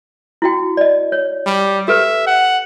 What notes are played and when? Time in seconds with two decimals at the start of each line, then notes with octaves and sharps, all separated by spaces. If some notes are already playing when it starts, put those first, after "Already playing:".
0.42 E4 F#4 G5
0.77 D5 D#5
1.12 C#5
1.46 G3
1.88 G4 A4 B4 E5
2.27 F#5